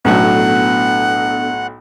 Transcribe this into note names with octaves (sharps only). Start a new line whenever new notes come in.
B1 A2 F#3 B3 D4 A4 F#5